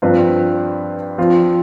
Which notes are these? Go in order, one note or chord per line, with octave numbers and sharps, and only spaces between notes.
G2 F3 C4 F4 B4
F3 C4 F4 C5